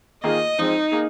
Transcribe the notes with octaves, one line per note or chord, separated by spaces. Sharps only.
D#3 A#3 F4 G#4 D#5
F3 G#3 C4 D#4
A#3 G#4